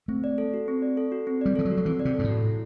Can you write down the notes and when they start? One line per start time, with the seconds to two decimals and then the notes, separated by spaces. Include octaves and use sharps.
0.08 A3 C4
0.24 D5
0.38 A4
0.54 F#4
0.68 C4
0.82 D5
0.97 A4
1.12 F#4
1.27 C4
1.41 G3 D5
1.56 E3 A4
1.65 F#3
1.71 F#4
1.77 F#3
1.85 E3 C4
2.00 D5
2.05 C3
2.15 G2 A4
2.24 A2
2.29 F#4
2.45 E4